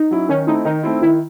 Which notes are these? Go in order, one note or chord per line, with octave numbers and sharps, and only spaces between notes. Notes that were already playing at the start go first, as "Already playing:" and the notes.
Already playing: D#4
F#3 C#4 E4
D#3 C#4
A3 C4 D#4 E4
D#3 D#4
A3 C4 E4
D#3 E4